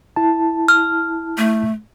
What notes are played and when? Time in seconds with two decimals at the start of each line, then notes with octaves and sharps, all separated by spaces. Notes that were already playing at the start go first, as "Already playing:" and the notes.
0.16 E4 A5
0.68 F6
1.37 A3